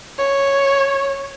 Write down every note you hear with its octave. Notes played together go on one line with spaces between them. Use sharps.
C#5